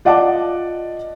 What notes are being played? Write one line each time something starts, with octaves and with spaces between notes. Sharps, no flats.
F4 D5 D#5 F#5 A5 D6